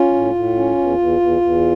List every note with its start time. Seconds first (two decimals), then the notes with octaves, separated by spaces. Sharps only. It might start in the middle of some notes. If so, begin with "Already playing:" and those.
Already playing: C#4 F4
0.14 A2
0.35 A2
0.56 C#4
0.77 E2
0.99 E2
1.20 E2
1.41 E2